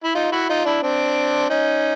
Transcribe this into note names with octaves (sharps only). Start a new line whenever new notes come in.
E4
D#4 F4
E4 F#4
D#4 F4
D4 E4
C4 D4
C#4 D#4